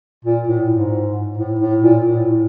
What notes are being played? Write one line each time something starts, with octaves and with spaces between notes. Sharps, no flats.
A#2
A2
G#2
A2
A2
A#2
A2